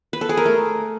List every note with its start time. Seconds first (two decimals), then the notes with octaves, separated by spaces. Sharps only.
0.13 B4
0.21 A4
0.29 G#4
0.37 A#4
0.45 A3